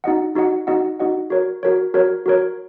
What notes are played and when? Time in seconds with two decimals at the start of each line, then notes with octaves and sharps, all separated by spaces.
0.04 D#4 F#4 D#5 F#5
0.35 D#4 F#4 D#5 F#5
0.67 D#4 F#4 D#5 F#5
0.99 D#4 F#4 D#5 F#5
1.30 F#4 A#4 C#5
1.63 F#4 A#4 C#5
1.94 F#4 A#4 C#5
2.26 F#4 A#4 C#5